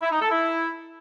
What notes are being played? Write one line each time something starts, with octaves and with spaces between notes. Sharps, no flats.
E4
D#4
A4
E4